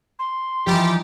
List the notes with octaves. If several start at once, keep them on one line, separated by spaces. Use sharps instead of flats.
C6
E3 F3 G3 D#4 G4